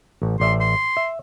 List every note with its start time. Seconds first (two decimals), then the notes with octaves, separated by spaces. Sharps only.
0.22 A1
0.40 A1 D5 E5 C6
0.60 C6
0.97 E5